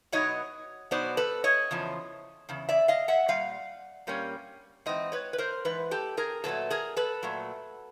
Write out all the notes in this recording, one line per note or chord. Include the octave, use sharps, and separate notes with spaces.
B2 F#3 B3 D#4 C#5 D#5
B2 F#3 B3 D#4 C5 D5
A4 B4
C#5 D#5
E2 C#3 F3
E2 C#3
D5 E5
D#5 F5
E5 F#5
A#2 G3 F5
A#2 G3 A#3 C#4
G#2 E3 C4 D#5
B4 C#5
B4
A#4 C5
G#2 E3 B4
G4 A4
G#4 A#4
A#2 F#3 A3 A4 B4
G#4 A#4
A4 B4
A#2 F#3 A3